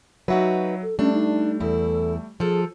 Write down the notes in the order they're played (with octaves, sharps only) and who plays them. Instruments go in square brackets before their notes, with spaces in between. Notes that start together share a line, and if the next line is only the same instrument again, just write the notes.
[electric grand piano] F#3 E5 [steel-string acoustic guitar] D#4 F#4 B4
[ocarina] A4
[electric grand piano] G3 A3 [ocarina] C#4 [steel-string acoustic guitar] D4
[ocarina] D#4
[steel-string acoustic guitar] E2 E4 [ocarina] A4
[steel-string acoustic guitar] F3 A4 [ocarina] G#4